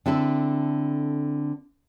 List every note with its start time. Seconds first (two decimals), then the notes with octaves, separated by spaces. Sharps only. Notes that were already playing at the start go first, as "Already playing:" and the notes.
0.06 D3 C4 E4 A4